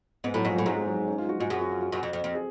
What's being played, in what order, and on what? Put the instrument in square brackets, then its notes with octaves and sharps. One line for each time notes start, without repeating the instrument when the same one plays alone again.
[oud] G#2 [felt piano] B3
[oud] A2 [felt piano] F#3
[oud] G#2 [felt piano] F3
[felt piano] F#3
[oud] A2
[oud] G#2 [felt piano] F#3
[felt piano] G#3
F#3
C#4
F4
F#4
[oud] G#2 [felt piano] F#4
[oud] F#2 [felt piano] G#4
[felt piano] F#4
F4
F#4
[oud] F#2
F2
F2
F2
[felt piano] G#4